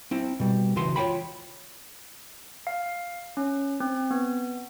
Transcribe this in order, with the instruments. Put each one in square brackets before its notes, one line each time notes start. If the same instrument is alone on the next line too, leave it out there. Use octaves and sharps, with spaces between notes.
[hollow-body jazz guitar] C4 E4
B2 G3
C#2 E3 F#4 C6
F4 C#5 G5 B5
[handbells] F5
C#4
C4
B3